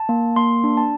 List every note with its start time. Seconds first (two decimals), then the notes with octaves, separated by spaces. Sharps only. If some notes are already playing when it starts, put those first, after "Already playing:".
Already playing: A5
0.09 A#3
0.36 A#3 C6
0.64 D4
0.77 A5